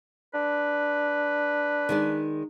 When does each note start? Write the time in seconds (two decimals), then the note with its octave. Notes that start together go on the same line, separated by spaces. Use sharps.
0.34 D4 B4
1.89 D#3 G#3 D5